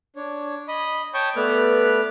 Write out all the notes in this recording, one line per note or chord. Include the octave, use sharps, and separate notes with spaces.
D4 C#5
D#5 B5 D#6
C#5 G5 A5 C#6 D#6 G6
A3 B3 B4 D5 F6